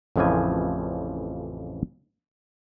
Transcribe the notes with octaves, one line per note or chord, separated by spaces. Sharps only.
A1 F2 C#3 E3 F3 G#5